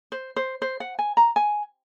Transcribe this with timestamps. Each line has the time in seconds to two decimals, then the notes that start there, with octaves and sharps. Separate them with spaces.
0.12 C5
0.36 C5
0.62 C5
0.80 F#5
0.99 G#5
1.17 A#5
1.36 G#5